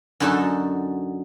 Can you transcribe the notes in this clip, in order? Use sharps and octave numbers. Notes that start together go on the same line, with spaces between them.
F#2 D3 D#4 F#4 A4 A5